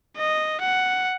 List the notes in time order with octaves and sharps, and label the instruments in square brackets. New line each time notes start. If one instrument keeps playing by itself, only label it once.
[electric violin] D#5
F#5